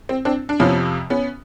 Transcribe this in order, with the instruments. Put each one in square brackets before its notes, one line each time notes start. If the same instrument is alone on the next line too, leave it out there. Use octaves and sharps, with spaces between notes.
[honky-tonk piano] C4
C4 D4
D4
F2 C3 F3 B3 C#4
B3 C#4